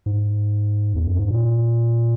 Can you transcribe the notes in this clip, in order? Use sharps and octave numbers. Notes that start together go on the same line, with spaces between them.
G#2
E2
F#2
G#2
A#2